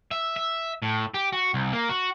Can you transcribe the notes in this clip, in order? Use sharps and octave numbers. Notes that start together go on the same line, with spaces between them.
E5
E5
A2
G4
F#4
C2
A#3
F#4